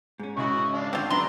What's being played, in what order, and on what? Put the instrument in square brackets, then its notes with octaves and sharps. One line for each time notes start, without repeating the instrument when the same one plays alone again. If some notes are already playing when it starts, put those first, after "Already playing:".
[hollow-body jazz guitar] G#2 C#4
[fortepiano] C#3 E4 B5 [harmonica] F#4 D#5 C#6
[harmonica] D4 F5
[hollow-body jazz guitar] G#2 D3 [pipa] C4 F4
[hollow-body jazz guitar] F#3 [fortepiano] D4 B4 E5 [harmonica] A#5 [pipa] C6